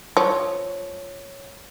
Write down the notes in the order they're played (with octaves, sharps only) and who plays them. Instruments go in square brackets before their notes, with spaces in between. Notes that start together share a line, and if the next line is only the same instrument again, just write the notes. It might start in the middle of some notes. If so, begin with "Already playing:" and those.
[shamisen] F3 [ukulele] C#5